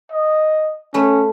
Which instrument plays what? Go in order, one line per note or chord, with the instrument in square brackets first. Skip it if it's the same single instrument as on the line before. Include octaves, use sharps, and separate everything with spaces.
[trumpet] D#5
[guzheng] A3 B4 [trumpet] C#4